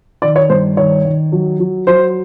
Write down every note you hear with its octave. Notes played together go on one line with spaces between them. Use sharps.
D#3 D5
C#5
G2 C5
D#3 C#5
D#3
F#3
F#3
F#3 C5